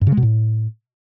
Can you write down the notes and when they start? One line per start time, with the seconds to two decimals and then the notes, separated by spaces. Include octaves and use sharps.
0.01 G2
0.07 C#3
0.12 G#3
0.17 B2
0.23 A2